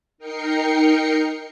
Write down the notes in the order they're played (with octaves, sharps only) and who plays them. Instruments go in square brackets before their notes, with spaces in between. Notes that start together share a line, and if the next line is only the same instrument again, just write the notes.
[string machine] D#4 A#4 G5 C7 C#7